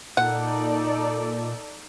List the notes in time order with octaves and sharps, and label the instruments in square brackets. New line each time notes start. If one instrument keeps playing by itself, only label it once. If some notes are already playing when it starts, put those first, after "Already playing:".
[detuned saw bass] A#2 [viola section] D#4 A4 D5 [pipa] F#5